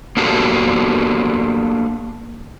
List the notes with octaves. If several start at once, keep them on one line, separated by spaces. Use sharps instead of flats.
A#3 B3 D4 F#4 G4 A4